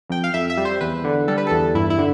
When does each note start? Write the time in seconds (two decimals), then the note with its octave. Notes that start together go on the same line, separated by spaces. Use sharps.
0.10 F2 G5
0.24 F5
0.34 F2 E5
0.50 E5
0.57 G3
0.65 C5
0.81 E2 B4
1.04 D3
1.28 G3 A4
1.38 B4
1.47 E2 A4
1.74 G2 E4
1.90 E4
1.98 D3